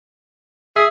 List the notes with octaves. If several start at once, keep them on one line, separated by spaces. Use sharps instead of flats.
G#4 E5